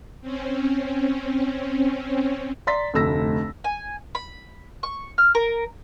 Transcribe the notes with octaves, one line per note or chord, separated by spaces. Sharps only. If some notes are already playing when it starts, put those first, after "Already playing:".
C4 C#4
D5 A#5 C6 A6 B6
F1 D2 E6 A#6
G#5
B5
C#6
F6
A#4